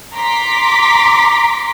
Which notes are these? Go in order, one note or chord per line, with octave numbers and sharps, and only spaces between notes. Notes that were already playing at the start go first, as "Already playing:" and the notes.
A#5 C6 D6 B6